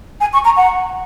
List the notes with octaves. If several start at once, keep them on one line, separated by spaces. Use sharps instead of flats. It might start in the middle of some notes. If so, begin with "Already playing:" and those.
G#5
C#6
A#5
F#5